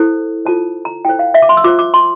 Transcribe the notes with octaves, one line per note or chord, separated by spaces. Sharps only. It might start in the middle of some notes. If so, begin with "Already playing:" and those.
Already playing: E4 A4 C5
F4 A4 C5 A5
A#5
E4 A4 C5 G5
F5
E5
D6
C6
E6
F4 C5 D6
D6
C6